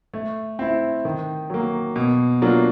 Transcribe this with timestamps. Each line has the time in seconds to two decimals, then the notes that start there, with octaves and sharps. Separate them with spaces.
0.14 A3
0.59 C4 E4
1.05 D#3
1.50 F#3 A#3
1.96 B2
2.42 F#3 A#3 D4 F4